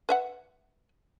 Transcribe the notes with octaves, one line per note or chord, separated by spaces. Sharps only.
B4 E5 F#5